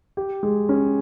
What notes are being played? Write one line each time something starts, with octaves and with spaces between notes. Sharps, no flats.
G4
G#3
C#4